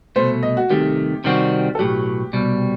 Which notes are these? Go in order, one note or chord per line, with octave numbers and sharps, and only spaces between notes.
C2 B2 A3 C5
D#5
F#4
C2 C3 D#3 A3 G4
C3 D#3 G3 C4 F#4
A4
B1 A2 F#3 G4
C2 B2 G3